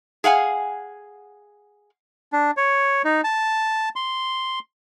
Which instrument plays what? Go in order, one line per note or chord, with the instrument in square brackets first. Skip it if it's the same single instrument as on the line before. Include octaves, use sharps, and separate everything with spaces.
[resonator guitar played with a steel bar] G#4 F5 F#5 G#5
[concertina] D4
C#5
D#4
A5
C6